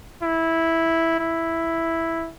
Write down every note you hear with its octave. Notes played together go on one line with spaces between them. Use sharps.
E4
E4